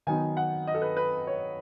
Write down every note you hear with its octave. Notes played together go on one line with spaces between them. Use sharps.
D#3 F#3 B3 D#4 G#5
F#5
D#5
A4
B4
B4
C#5